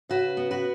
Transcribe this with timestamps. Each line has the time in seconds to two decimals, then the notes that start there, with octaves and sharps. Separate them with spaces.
0.09 C#3 F#4 B4
0.37 B3
0.51 F#4 B4